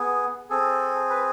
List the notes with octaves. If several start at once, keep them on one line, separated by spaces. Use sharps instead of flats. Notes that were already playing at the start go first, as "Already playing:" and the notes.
Already playing: B3 G#4
C4 G#4 A4
B4